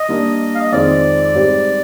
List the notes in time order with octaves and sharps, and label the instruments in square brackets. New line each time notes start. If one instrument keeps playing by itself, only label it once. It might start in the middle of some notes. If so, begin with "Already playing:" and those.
Already playing: [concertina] D#5
[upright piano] G3 A#3 D4
[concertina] F5
D#5
[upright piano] F2 D#3 G#3 C4 [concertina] D5
[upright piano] G#2 G3 C4 G4 C5